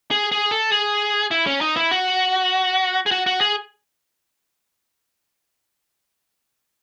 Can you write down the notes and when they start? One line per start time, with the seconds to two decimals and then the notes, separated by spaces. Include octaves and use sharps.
0.11 G#4
0.32 G#4
0.51 A4
0.71 G#4
1.31 E4
1.47 C#4
1.61 D#4
1.76 E4
1.91 F#4
3.06 G#4
3.11 F#4
3.26 F#4
3.41 G#4